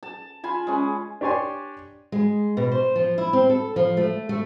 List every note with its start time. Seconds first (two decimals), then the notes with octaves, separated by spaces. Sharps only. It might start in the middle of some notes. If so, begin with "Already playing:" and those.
0.03 A5
0.43 F4 G#5 B5
0.67 G#3 C#4
1.21 D4 G4 C#5 D5 G#5 C6
2.12 G#3
2.57 B2
2.71 C5
2.96 F3
3.18 E4
3.33 C4
3.50 A4
3.76 F3
3.97 A3
4.29 A3